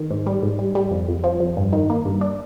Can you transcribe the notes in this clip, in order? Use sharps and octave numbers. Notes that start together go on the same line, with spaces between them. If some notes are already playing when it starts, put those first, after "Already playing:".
Already playing: D#3
G#2
G3
G#2
G3
G3
F2
F2
F3
F2
G2
D#3
A#3
G2
D4